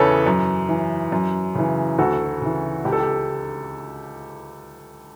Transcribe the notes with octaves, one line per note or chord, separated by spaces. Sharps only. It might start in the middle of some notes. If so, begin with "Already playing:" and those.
Already playing: E2 C#3 E3 A4 B4 C#5
F#2
E3
F#2
C#3 E3
D2 F#4 A4
C#3 E3
C#2 G4
A4
G4